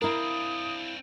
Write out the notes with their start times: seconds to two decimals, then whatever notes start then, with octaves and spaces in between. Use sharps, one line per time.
0.02 C4 D4 E4 A#4 F5 D#6